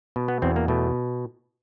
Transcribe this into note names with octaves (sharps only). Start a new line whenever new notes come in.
B2
B3
E2 C4
A#3
B2 A3